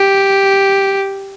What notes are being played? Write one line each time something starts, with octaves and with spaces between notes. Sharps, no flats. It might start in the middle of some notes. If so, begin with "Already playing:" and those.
Already playing: G4